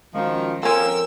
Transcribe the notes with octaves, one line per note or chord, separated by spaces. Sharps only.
D#3 F3 G#3 C#4 F#4
F3 C4 C#4 A4 A#4 E6